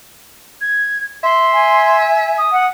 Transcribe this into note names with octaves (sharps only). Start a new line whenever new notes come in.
G#6
E5 C6
G#5
D#6
F#5